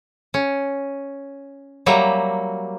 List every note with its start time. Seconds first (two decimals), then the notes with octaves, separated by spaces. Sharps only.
0.34 C#4
1.86 F#3 G3 A#3 E5